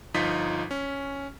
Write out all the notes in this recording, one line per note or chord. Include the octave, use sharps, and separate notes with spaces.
G1 F3 D#4 F4 B6
C#4